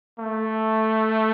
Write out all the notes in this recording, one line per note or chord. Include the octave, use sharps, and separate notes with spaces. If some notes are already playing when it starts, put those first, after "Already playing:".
A3